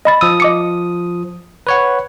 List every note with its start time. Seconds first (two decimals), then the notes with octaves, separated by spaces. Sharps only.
0.05 D#5 B5 A6
0.21 F3 D#6 E6
0.40 D#5 D6 C#7
1.67 B4 C#5 F#5